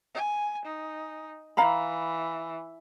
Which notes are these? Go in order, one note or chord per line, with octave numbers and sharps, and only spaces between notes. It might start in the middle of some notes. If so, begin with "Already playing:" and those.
G#5
D#4
E3 F5 A#5 B5